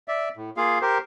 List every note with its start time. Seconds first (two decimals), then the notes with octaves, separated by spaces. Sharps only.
0.08 D5 E5
0.37 A2
0.57 A#3 F4 G#4 F5
0.81 G4 A#4 C5